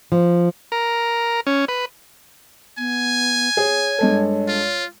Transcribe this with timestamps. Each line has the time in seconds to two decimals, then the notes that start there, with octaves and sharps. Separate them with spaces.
0.12 F3
0.72 A#4
1.47 C#4
1.68 B4
2.78 B3 G#5
3.57 G#4 C#5
3.99 G2 G#3 A4
4.48 F4